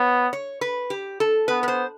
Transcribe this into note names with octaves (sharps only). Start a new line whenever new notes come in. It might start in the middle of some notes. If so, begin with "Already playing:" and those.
Already playing: B3 C#5
C#5
B4
G4
A4
B3 B4
B4
C5